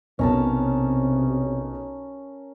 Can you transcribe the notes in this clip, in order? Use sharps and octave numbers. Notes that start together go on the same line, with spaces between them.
B1 C3 C#4 A#4 A5